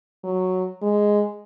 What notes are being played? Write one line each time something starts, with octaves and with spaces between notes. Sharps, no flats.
F#3
G#3